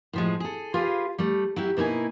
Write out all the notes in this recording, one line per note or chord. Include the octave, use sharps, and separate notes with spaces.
A2 F3 G#3
G#4 A4
F4 G4 G#4 B4 F5
G3 A3
F#3 E4 G4
B2 A#3 D#4 E4 G#5